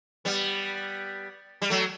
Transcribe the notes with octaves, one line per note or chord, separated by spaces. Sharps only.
G3 B3
G3
F#3 A3